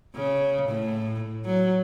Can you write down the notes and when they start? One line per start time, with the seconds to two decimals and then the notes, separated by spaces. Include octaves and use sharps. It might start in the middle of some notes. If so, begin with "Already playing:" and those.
0.15 C#3
0.69 A2
1.45 F#3